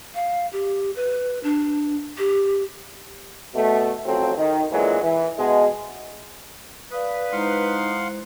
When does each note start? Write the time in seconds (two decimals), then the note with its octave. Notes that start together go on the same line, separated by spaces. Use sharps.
0.14 F5
0.53 G4
0.96 B4
1.44 D4
2.18 G4
3.55 B2 A3
4.06 A1 F2 F#3 C4 A4
4.38 D#3
4.72 A#2 D3 E3 F#3 G#3
5.03 E3
5.39 B2 G#3
6.92 B4 D5 F5 D#6
7.32 G#3 D#4 E4 C5 F5 F#5 C6